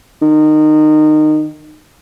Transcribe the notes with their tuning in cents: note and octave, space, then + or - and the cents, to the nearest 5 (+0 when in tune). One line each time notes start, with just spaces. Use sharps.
D#3 -20